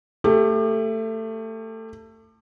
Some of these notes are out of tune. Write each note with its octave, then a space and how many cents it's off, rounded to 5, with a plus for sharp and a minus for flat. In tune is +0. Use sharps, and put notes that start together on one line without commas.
A3 +20 G4 +30